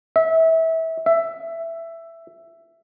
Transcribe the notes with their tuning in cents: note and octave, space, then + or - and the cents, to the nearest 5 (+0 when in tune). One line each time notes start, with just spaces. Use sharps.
E5 -25
E5 +10